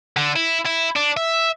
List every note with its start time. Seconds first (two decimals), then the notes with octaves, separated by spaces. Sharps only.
0.17 D3
0.36 E4
0.66 E4
0.96 D4
1.17 E5